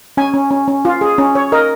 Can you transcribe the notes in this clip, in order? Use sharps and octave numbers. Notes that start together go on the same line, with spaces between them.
C#4 G#5
C#4
C#4
C#4
F4
G#4
C#4
C#5
A#4 D#5